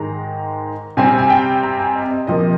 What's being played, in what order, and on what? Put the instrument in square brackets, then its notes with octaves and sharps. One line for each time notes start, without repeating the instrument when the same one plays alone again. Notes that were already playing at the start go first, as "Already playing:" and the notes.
Already playing: [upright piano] G#2 D#3 G#3 A#5
C3 G3 C4 G#5
G#5
G5
A#5
G#5
D#5
D#5
C3 F3 A#3 D#5